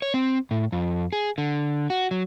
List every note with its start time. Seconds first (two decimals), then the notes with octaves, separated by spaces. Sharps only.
0.02 C#5
0.14 C4
0.51 A2
0.72 F2
1.13 G#4
1.38 D3
1.90 F#4
2.11 F#3